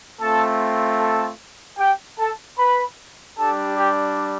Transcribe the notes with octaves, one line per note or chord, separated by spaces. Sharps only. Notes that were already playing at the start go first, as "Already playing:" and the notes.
A3 C4 F4 A4 A5
A4 A5
G4 G5
A4 A5
B4 B5
G3 D4 G4 A4 A5
G4 G5